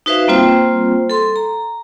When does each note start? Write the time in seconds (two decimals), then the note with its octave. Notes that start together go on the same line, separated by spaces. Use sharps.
0.06 D#4 F#4 B4 C5 E5 F5
0.28 G3 A#3 C4 F4 C5 G5
1.10 A4 C6
1.36 A#5